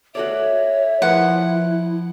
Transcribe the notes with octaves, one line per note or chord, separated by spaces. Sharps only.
F#4 A4 C#5 D5 E5
F3 E4 A#4 B4 F#5